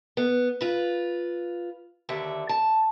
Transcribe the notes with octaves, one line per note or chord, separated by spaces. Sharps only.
B3
F4 B4
D#2 D3 E5
A5